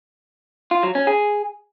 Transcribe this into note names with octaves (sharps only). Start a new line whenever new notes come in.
F4
F#3
C#4
G#4